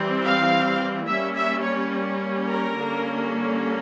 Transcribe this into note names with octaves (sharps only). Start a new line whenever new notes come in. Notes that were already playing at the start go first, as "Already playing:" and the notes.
Already playing: E3 G3 C4
F5
G3 A#3 C#4 E5
E5
C#5
A#4
D3 G3 A#3 C#4